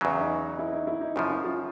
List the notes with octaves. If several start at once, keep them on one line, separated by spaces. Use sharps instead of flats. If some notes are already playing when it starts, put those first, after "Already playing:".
E2 C#3 F#3
D#4
E4
D#4
E4
D#4
F#2 C#3 F3 E4
E4
F4